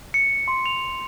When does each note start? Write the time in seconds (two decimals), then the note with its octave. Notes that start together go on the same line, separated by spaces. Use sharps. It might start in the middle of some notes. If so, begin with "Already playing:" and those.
0.14 C#7
0.48 C6
0.66 F7